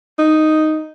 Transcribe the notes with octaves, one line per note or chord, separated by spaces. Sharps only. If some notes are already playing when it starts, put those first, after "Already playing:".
D#4